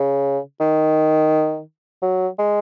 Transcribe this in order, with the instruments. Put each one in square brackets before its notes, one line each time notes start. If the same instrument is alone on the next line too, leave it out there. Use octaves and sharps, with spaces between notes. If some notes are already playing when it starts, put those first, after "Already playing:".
Already playing: [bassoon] C#3
D#3
F#3
G#3